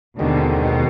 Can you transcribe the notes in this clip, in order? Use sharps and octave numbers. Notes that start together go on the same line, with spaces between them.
D#2 B2 D3 D#3 G#3 C4
B2